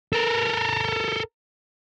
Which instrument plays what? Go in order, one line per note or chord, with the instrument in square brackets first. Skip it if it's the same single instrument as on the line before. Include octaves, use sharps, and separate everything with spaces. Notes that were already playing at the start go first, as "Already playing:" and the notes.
[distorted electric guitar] A4 A#4